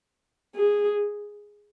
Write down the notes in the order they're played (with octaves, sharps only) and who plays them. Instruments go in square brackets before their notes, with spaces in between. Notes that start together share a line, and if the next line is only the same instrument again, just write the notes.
[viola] G#4